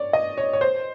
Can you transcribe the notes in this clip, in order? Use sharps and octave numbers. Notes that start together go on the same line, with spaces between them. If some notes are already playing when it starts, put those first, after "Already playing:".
Already playing: C#5 D5
D#5
C#5
C#5
C5